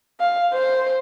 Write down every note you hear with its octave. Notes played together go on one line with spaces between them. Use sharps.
F5
C5